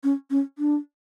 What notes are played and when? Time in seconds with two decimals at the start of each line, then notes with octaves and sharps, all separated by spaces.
0.04 C#4
0.30 C#4
0.58 D4